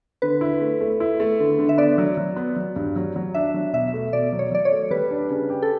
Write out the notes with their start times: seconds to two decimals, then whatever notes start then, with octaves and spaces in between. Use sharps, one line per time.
0.22 D3 B4
0.41 E4
0.61 A3
0.81 A3
1.00 E4
1.20 A3
1.40 D3
1.59 D3
1.69 E5
1.78 B3 D5
1.98 F#3
2.17 F#3
2.36 B3
2.56 F#3
2.76 G2
2.96 F#3
3.16 F#3
3.34 D4 E5
3.54 F#3
3.73 B2 E5
3.93 A3
4.13 B2 D5
4.32 F#3
4.39 C#5
4.52 F#3 D5
4.65 C#5
4.72 A3
4.91 G3 B4
5.11 D4
5.30 C#3
5.50 G4
5.62 A4